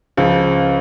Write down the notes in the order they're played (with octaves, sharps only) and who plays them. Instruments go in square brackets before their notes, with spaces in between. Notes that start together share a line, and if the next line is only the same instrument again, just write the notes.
[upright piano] C#2 C#3 F3